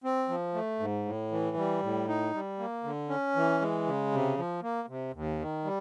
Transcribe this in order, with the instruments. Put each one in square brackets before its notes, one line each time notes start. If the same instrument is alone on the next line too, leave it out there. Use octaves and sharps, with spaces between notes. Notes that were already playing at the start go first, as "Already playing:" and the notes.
[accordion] C4
F3
A3
G#2
A2
E3
G3
A2
D#4
G3
A#3
D3
C#4
E3
G#3
C#3
C3
F3
A#3
C3
D#2
D#3
G3